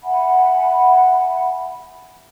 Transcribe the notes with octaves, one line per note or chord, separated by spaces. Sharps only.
E5 F#5 G#5 B5